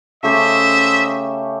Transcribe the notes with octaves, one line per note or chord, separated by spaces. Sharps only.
C#3 A3 G4 C5 D#5 E5